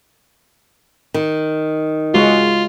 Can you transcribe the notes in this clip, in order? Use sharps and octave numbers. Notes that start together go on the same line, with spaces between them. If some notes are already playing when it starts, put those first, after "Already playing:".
D#3
G#3 F4 F#4